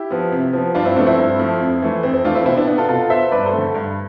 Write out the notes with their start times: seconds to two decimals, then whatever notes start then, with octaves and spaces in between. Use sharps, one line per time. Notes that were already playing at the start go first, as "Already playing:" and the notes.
Already playing: E4 G4
0.10 F3 B3
0.32 C3
0.53 F3 B3
0.74 G2 D4 F4
0.85 C4 E4
0.96 F3 A3 B3 D4
1.07 C4 E4
1.18 G2
1.39 F3 A3
1.60 F2
1.82 E3 A3
2.03 F2 C4
2.14 C4
2.25 E3 A3 D4 F4
2.35 C4 E4
2.46 B2 C4 E4
2.57 B3 D4
2.67 B3 D4
2.78 F4 A4
2.89 B2 F4 A4
3.10 B3 C5 E5
3.32 G2 B4 D5
3.46 A4 C5
3.53 D3 A3
3.74 G2